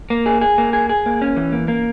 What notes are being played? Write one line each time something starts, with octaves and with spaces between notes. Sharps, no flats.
A#3
G#4
G#4
A#3
G#4
G#4
A#3
C#4
E3
A#3
A#3